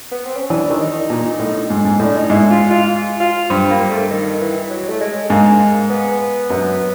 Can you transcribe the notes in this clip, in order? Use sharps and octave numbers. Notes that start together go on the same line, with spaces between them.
B3
C4
C#4
E3 D4
D#3
D4
D#4
A#2
A2
G#2
G#2
A2 D4
D#4
G#2 E4
F4
F4
F4
G2 C4
A#3
A3
D#3
E3
F#3
A3
G#3
G#2 A#3
B3
F#2